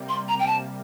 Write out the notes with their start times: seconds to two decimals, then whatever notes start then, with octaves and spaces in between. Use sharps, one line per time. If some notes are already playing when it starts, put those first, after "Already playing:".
Already playing: C3 G3 A#3
0.09 C6
0.28 A#5
0.39 G5
0.47 A5